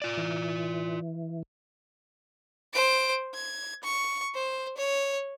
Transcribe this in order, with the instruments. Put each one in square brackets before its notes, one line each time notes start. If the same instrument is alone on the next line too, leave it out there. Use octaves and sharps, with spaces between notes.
[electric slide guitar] F4 D5
[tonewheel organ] E3
[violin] C5 D7
G#6
C#6
C5
C#5